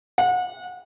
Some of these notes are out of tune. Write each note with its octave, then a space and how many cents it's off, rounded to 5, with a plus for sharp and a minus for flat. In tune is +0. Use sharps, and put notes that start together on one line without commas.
F#5 -30